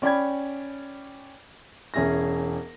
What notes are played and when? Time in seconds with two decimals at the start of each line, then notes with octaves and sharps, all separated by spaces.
0.02 C#4 D5 G5 B5 G#6
1.94 E1 C#4 G#4 E5 A#6